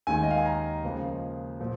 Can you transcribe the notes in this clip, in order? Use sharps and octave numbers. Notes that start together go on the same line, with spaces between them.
D#2 D#3 G#3 G#5
D#5
F5
G#5
A#5
C#2 C#3 F3 A#3
A#2 F3